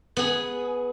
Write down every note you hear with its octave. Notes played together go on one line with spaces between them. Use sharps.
B3 G#4